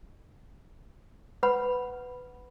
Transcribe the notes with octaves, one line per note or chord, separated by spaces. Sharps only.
B4 F#5 B5